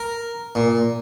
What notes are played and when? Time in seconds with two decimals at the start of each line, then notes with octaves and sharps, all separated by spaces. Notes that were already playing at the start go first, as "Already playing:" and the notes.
Already playing: A#4
0.55 A#2